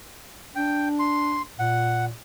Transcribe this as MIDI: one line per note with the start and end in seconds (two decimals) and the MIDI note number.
0.56 1.40 62
0.56 0.88 79
0.99 1.42 84
1.59 2.10 46
1.59 2.05 78